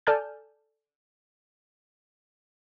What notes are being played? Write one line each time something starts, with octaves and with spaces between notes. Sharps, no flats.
A4 D5 G#5 A5 F6 G6